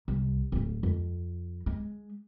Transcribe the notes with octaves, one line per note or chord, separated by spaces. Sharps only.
C2
D1 G#1
F2
G#3